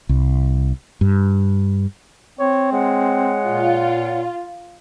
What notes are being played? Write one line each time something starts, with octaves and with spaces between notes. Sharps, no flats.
C2
G2
C4 C#5
G#3 C#5 F#5
A#2 F4